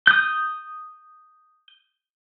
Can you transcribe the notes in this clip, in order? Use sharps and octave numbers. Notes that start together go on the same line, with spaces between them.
D#6 G6